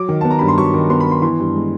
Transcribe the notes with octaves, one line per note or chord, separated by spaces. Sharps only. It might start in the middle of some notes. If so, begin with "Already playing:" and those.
Already playing: F#3 D6
D#3
B3 A5
A#5
G2 B5
C6
F#3 C#6
D#3
B3 C6
B5
B3
C6
E3 C6
G2
G#3